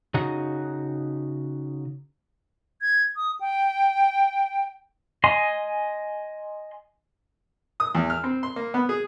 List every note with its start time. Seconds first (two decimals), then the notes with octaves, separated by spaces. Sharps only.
0.14 C#3 D#4 F#4
2.82 G#6
3.16 D#6
3.40 G5
5.24 D#5 G#5 C6
7.80 D#6
7.95 E2
8.10 F6
8.24 C4
8.43 C6
8.56 A#3
8.74 B3
8.89 G#4